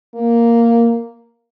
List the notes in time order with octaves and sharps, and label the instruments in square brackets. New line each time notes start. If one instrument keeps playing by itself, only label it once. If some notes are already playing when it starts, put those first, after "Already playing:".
[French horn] A#3